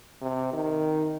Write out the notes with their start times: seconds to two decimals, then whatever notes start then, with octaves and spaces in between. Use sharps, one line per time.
0.21 C3
0.53 D#3